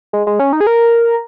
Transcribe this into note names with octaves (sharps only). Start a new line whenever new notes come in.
G#3
G#3
C#4
D#4
G#4
A#4